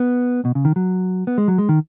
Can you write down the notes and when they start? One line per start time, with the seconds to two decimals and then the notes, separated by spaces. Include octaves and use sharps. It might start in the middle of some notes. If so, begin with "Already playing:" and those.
Already playing: B3
0.45 B2
0.55 C#3
0.65 D#3
0.76 F#3
1.27 B3
1.38 G#3
1.48 F#3
1.58 G#3
1.69 D#3